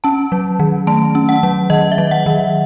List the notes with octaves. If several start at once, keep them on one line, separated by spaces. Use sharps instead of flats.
C#4 A5
F#3
D#3
A3 A5
C#4
F#5
F#3
D#3 D#5
E5
F#3
F#5
D#3